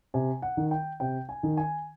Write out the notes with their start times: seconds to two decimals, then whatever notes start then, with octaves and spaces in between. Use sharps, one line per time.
0.14 C3 G#5
0.42 F#5
0.57 D#3
0.71 G5
1.00 C3 G5
1.29 G#5
1.43 D#3
1.57 G#5